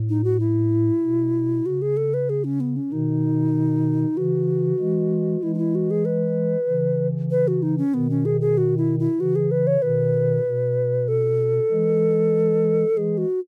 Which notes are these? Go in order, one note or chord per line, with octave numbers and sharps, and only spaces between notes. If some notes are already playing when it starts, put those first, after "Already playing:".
Already playing: A2
D#4
F#4
E4
B2
C#3 F#4
G#4
A4
B4
G#4
C#4
B3
C#4
B2 D#3 D#4
C#3 E3 F#4
E3 G#3
E3 G#3 E4
D#4
E4
F#4
G#4
B4
C#3 E3
B4
F#4
D#4
C#4
B2 D#3 B3
C#4
G#4
G#4
F#4
E4
E4
C#3 E3 F#4
G#4
B4
C#5
B2 D#3 B4
B2
A4
E3 G#3
E3 G#3 G#4
F#4